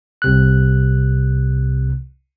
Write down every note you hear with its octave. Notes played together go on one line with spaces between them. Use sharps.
C2 C3 F#6